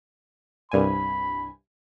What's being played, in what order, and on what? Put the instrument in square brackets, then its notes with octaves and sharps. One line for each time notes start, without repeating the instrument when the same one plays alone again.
[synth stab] C2 G2 G#5 [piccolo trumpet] B5